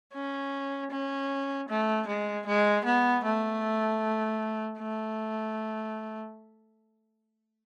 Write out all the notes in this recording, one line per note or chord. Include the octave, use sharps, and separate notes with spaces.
C#4
C#4
A3
G#3
G#3
B3
A3
A3